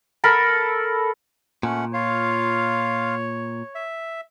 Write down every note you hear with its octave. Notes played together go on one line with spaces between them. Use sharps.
A4 A#4 B5
A#2 A3 C#4 F#5
F4 C#5 F5
E5